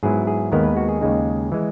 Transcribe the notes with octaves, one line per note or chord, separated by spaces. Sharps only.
G#2 F#3 B3 E4 G#4
G#4
D#2 D#3 G#3 B3 A#4
B4
F#4
G#4
D#2 C#3 G#3 D#4
E3 G#3